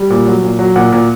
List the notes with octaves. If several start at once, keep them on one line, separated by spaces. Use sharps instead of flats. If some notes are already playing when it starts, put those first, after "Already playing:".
Already playing: G3
A#2
F#3
A#2
F#3
A#2 F#5
A#2